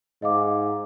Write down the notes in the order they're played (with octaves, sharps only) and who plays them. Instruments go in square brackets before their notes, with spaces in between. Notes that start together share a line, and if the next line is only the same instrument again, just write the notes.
[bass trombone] G#2 [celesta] D#5 F5 D6